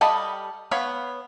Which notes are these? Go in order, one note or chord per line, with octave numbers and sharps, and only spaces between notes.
G3 A4 D#5 F5 B5
B3 C#5 F5 B5